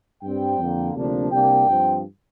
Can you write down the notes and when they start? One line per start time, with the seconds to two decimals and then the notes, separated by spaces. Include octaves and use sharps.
0.23 G2 G3 C4 G5
0.59 F2 D3 A#3
0.95 D2 C3 F3 A#3 D4
1.31 C2 C3 A#3 D4 G5
1.68 G2 F3 C4